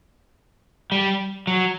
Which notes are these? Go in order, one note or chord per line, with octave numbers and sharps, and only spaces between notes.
G3
F#3